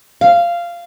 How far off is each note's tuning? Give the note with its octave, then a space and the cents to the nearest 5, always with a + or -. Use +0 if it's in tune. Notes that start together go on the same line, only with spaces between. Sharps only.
F5 -15